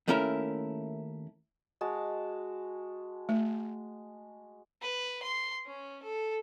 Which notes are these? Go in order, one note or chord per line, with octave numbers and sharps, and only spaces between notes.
D#2 A3 C#4 E4 A#4
G#3 F#4 A5
A3
B4
C6
C#4
A4